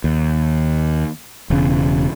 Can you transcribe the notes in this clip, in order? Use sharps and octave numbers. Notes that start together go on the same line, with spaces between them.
D#2
E1 C#3